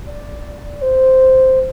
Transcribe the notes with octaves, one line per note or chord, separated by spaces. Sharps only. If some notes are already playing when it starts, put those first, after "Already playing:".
D5
C5